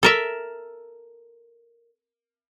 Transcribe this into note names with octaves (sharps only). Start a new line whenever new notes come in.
A4 A#4 E5